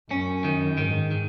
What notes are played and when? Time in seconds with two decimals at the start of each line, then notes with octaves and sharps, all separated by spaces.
0.11 F#2 C#4
0.44 D#3
0.77 G#2 D#3
1.11 D#3